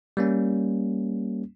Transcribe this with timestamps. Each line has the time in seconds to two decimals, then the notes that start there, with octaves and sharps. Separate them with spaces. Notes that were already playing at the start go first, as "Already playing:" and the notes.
0.17 G3 A#3 C#4